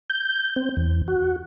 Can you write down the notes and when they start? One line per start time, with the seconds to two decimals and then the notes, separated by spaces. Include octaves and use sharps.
0.10 G6
0.56 C4
0.77 E2
1.08 F#4